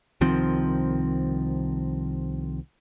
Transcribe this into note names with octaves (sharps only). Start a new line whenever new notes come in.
C2 D#3 F3 C4